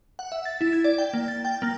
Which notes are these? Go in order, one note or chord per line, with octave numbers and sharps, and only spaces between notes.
F#5
E5
A6
E4
G#6
D5
G5
A#3
A6
G5
A#3